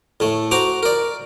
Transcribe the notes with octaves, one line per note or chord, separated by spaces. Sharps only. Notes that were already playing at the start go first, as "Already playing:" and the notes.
A2 A3
F#4 C5 A#5 D6
A#4 D5